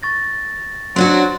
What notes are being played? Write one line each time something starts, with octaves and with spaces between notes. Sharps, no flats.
C#6 A6 A#6
F#3 C4 D4 F#4 C6